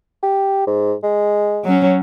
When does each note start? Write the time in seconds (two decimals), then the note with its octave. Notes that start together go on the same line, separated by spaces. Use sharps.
0.23 G4
0.67 G#2
1.03 G#3
1.65 F#3 C#4